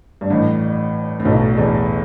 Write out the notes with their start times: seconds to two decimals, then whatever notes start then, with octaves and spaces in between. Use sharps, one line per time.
0.21 G2
0.30 A1 A2
1.20 A2
1.25 B1 B2
1.57 E2